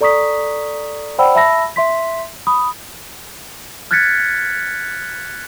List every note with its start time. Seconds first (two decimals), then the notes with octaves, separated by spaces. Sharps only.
0.01 A4 D5 A#5 C#6 D#6 B6
1.18 C5 D5 F#5 G5 B5 E6
1.35 E5 A5 B5 E6 A#6
1.76 E5 C6 B6
2.47 B5 D#6
3.91 F6 F#6 G#6 A6 B6 C#7